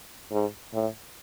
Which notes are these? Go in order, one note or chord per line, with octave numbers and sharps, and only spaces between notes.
G#2
A2